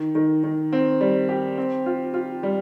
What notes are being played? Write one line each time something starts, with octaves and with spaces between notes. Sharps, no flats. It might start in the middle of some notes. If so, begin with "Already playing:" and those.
Already playing: D#3
D#3
D#3
C4
G3
G4
C4
F4
F4
G3